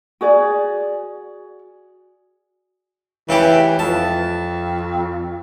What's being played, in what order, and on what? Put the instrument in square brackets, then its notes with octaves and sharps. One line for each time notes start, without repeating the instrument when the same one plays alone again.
[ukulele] F#4 G#4 D5
[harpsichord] C#3 E4 G4 [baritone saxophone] E3
[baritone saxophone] F2 [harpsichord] A5